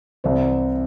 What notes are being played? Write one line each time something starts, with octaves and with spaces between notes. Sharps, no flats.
C2 C3 E3 C5